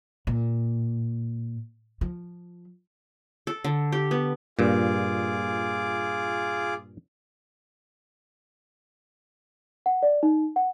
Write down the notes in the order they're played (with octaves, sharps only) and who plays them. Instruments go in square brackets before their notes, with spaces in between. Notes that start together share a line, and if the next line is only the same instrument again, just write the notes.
[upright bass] A#2
F3
[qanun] A4
D3
G4
B3
[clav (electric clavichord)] G2 A#2 [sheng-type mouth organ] F4 G#4 D6
[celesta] F#5
D5
D#4
F#5